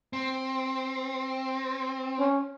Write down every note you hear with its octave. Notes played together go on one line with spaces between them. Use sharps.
C4
C#4